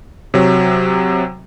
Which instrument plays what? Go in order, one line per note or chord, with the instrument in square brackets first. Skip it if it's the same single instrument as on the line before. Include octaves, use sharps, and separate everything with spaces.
[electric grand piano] C3 F#3